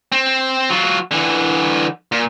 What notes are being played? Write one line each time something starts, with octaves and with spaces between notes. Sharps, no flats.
C4
F#3 F4
D3 E3
A#2